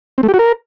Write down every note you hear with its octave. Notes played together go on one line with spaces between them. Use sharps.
C4
A3
G4
F#4
A#4